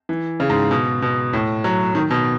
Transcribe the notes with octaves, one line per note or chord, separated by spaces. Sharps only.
E3
C#3
G#2
B2
B2
A2
F#3
D#3
B2